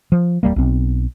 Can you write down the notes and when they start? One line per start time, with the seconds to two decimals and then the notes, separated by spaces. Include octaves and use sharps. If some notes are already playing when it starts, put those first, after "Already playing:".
0.12 F3
0.43 E1 D#2 G3 A#3
0.56 B1 C4